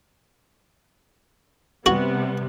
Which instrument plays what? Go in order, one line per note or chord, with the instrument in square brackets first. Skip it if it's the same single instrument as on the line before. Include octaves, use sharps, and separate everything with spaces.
[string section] C3 G3 B3 [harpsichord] F#4